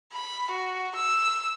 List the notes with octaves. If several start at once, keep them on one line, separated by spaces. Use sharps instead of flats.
B5
F#4
E6